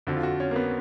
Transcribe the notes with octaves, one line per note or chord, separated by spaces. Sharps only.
F2 D3 F#4
F4
F#4
C#4
A#3
B3